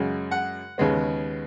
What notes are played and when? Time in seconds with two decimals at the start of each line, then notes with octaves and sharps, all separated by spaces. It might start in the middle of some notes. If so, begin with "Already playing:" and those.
Already playing: F#2 C#3 G#3
0.31 F#5
0.78 D#2 C#3 G#3 B3